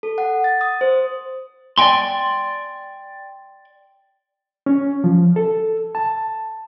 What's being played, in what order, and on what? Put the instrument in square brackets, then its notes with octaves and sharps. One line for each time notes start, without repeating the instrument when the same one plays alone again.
[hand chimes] A4
F#5
A6
D#6
C5
[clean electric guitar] D5 D#5 G5 G#5 C6
[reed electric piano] C#4
F3
A4
A5